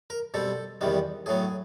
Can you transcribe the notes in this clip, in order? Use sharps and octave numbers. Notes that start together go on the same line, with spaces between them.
A#4
B2 G3 C4 A4
E2 C3 D#3 G3 B3
A2 F#3 B3 G#4